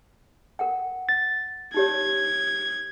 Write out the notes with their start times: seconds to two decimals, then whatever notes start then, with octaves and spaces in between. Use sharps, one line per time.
0.59 A#4 F#5 G5
1.09 A6
1.74 D#4 G4 C#5 G#6